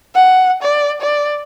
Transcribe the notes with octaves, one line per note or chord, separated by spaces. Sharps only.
F#5
D5
D5